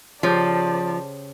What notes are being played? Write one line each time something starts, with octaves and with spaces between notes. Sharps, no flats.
C#3 F3 G4 C5 D5 A5